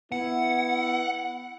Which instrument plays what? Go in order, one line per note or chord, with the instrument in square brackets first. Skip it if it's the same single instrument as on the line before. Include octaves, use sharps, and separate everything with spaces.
[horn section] B3 E4 [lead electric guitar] F#5